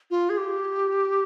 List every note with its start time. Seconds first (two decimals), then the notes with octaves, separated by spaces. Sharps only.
0.10 F4
0.29 G#4
0.37 G4